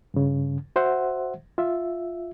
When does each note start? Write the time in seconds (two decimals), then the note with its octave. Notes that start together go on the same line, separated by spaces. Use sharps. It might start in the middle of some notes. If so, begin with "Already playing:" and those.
0.14 G2 C#3
0.76 F#4 C5 E5 F#5
1.58 F4 E5